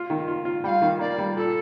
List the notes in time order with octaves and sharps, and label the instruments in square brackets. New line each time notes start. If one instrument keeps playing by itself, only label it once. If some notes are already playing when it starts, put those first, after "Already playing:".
Already playing: [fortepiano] F4
D#3
F4
F4
[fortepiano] G3 [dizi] F5 G5
[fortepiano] D#3
[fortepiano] A#3 [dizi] D5
[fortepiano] G3
[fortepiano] A#2 [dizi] A4